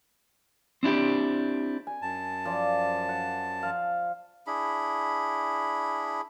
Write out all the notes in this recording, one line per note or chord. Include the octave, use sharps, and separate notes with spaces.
C4 D4 E4 G4
G#5
F#2 A5
F3 D5
F#5
F3 F5
D4 E4 G#4 B5